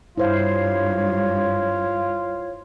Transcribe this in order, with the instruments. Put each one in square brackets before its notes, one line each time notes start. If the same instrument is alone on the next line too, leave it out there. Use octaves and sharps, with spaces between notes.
[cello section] G2 [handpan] E4 C5 F5 [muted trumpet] F4 [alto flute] C#5